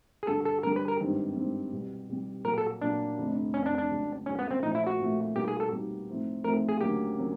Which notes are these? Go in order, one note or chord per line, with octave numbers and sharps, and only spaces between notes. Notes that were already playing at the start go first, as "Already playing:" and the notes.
G#4
G2 D3 G3 A4
A4
G2 D3 G3 A#4
B4
A#4
G#1 G2 D#3 G3 C4
G#1 G2 D#3 G3 C4
C2 B2 G3
C2 B2 G3
A#2 F#3 A#3 A#4
A4
A#2 F#3 A#3 D4
F1 F2 D3
F1 F2 D3 C#4
D4
D4
C#2 C#3 F#3
C#2 C#3 F#3 C#4
B3
C4
A#2 F3 A3 D#4
E4
F#4
A#2 F3 A3
B2 G3 A#3 D#4 F#4 G4
G#4
A4
B2 G3 A#3 D#4 F#4
A2 F3 A3 C4 D#4
A2 F3 A3 C4 D#4 A#4
G#4
D2 C#3 F#3 A#3 G4
C#3 F#3 A#3